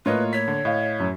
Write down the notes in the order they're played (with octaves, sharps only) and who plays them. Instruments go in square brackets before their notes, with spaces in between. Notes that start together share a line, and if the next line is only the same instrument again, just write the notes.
[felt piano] A2 A#3 [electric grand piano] F4 C#5 D#5 [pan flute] B4
[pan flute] C#5 [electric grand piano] B6
[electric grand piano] D3
[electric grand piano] A2 [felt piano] D#5 F5
[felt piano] F#2